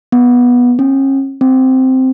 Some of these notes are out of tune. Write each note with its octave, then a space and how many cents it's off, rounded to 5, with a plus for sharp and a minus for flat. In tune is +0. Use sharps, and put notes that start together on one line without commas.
B3 -10
C#4 -40
C4 -5